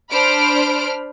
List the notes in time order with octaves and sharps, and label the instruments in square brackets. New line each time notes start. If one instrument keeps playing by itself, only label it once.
[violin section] D4 C5 B5 F6 D7